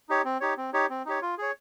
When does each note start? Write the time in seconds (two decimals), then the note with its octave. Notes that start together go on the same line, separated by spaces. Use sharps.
0.09 D#4 G4 C#5
0.25 C4
0.41 D#4 G4 C#5
0.57 C4
0.73 D#4 G4 C#5
0.90 C4
1.06 D#4 G4 C#5
1.22 F4
1.38 G#4 C#5